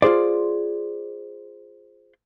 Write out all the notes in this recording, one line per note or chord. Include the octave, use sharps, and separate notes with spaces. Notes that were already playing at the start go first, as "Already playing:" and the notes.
F4 F#4 G#4 C5 D5